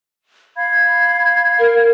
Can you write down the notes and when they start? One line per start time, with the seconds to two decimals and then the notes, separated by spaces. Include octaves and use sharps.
0.56 F5 B5 G#6
1.59 A#4